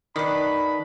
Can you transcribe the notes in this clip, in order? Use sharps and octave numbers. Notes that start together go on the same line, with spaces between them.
D#3 D4 B4 B5